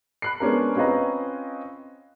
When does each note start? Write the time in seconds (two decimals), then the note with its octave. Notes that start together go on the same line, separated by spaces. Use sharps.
0.22 B5 F#6 C7
0.40 G#3 B3 C#4 D4 A#4
0.76 C4 C#4 F4 B4 D#5 A#5